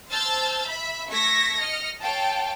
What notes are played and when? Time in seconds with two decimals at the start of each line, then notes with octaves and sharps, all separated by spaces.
0.10 C5 A5 E6 F6 G6 A6
0.67 E5 B5
1.09 A3 C#6 E6 G#6 A#6 B6
1.58 D#5 F6 C#7
2.00 A4 C#5 F5 G5 A5